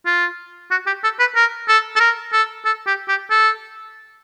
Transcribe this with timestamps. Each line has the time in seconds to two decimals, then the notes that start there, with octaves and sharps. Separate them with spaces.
0.06 F4
0.71 F#4
0.87 G4
1.04 A4
1.20 B4
1.35 A#4
1.68 A4
1.96 A4
2.00 A#4
2.33 A4
2.65 A4
2.87 G4
3.08 G4
3.30 A4